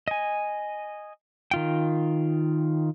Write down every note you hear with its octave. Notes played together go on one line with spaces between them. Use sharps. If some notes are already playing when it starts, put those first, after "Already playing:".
D#5 G#5
D#3 F4 G5